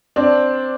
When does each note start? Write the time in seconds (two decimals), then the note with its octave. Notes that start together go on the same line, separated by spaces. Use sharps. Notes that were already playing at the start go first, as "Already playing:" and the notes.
0.16 C4 D4